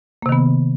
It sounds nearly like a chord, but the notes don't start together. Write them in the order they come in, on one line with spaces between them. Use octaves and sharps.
A#3 C3 D#3 B3